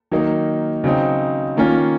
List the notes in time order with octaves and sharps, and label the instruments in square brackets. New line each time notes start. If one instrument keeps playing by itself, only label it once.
[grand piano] D#3 F#3 A#3 D#4
C#3 F#3 C4 D#4
D#3 A#3 C#4 F4